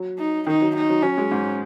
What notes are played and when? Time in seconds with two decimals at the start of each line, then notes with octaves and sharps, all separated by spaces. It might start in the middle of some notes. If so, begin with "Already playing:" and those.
Already playing: F#3
0.18 D#4
0.46 D#3 D#4
0.61 F#3
0.75 D#4
0.89 F#3
1.02 F#3 C#4
1.17 G#3
1.32 G#2